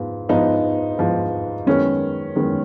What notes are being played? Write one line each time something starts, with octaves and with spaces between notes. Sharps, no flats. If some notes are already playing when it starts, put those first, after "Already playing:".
Already playing: G#2 F3 B3
G#2 F3 B3 D#4
G#2 F3 B3
F#2 D#3 G#3 B3 C#4
F#2 D#3 G#3 B3